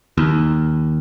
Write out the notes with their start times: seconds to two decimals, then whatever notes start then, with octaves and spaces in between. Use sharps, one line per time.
0.18 D#2